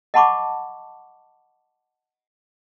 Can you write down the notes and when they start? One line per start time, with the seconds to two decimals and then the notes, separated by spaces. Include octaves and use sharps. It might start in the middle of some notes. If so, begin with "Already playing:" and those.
0.14 D#5 F#5 A5 B5 C#6 D6